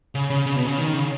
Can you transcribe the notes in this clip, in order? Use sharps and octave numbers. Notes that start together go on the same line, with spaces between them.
C#3
C#3
C#3
B2
C#3
D#3
C#3